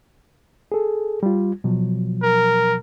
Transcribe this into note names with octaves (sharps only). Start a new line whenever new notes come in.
G#4 A4
G3 F4
B2 F3 F#3
A#4